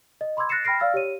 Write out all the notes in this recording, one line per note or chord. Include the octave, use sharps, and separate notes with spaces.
D#5
B5 C6 D6 E6 G#6
F#6 A6 A#6 C7 C#7 E7
G5 B5 F6 A#6 C7 D7
D5 F5 E6 F6 A6
G4 C#5 D#7